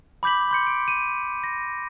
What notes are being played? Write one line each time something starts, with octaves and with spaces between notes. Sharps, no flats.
B5 D6 G6 B6 F#7
C6 G6 C#7
D7
D#7
A#6